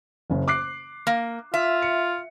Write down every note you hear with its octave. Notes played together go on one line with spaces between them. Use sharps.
F#1 C#3
D6 F#6 C7
A#3
F4 E5
C#7